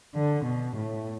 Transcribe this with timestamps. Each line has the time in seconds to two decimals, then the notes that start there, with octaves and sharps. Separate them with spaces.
0.16 D3
0.45 B2
0.76 A2